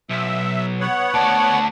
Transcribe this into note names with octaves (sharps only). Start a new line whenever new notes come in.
B1 E5
B3 C#5 F#5
D2 D5 A5